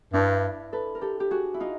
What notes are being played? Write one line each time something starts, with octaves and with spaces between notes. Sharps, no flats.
G2 D4 E4
A4 B4
A#4
G4 A4
G4
F#4 G#4
E4
D#4 F4